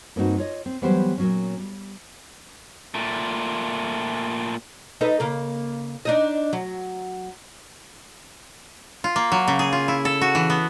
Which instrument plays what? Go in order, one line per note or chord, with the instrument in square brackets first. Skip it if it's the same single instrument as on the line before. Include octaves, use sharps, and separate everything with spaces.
[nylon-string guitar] G2 A#3 C4 D#4 F#4
F4 C#5 D#5
C4
E3 F#3 G3 B3 G4 C5
A#2 F#3 C#4
G3
[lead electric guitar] A#2 A3
[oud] D#4 A4 B4
C#3 A#3
D4 D#4 D#5
F#3
[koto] F4
A#3
F#3
C#3
G#4
F4
E4
A4
F#4
E3
B3